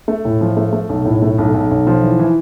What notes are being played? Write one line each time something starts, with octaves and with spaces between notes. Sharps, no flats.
A3
A2
F3
A3
A3
B1
A2
A3
B1
B1
B1
F3
E3
E3